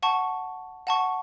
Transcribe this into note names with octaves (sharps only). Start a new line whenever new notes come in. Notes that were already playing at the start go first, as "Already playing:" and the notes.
F#5 A5 C#6
F#5 A5 C#6